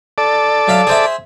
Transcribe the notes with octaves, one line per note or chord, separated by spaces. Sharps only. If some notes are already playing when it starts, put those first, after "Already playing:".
A4 D5
F#3 E5 F5
G#4 C5 E5